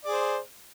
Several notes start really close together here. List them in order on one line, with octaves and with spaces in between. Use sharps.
D5 G#4 C5